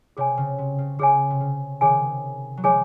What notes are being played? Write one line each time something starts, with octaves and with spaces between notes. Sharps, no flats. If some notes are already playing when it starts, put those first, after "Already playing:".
C3 G#4 C#5 G#5
C#3
C3
C#3
C#3 G#4 C#5 G#5
C3
C#3
C3 D#3 G#4 C#5 G#5
F#3
F3 G#3 G#4 C#5 G#5